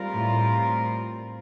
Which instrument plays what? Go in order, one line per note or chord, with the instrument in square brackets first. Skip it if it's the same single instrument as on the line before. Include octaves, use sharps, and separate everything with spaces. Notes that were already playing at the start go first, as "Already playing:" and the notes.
Already playing: [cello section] G3 C4 F4 A#4
[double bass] A2